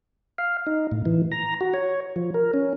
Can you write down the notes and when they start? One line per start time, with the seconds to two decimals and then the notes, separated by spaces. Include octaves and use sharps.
0.38 F5
0.67 D#4
0.91 A2
1.05 E3
1.32 A#5
1.61 F#4
1.74 C#5
2.16 F3
2.34 A#4
2.54 C#4